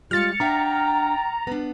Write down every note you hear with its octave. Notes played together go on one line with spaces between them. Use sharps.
G3 G#3 F4 F6 A6 C#7
D4 E5 F#5 G5 A#5
B3 D4